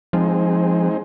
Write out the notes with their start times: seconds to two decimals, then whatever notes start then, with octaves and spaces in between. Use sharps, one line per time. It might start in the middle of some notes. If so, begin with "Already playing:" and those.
0.13 F3 G#3 C4 D#4